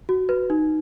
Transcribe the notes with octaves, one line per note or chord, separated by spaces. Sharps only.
F#4
B4
D#4